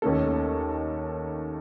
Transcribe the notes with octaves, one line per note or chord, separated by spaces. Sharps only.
D#2 D#3 A3 C#4 A4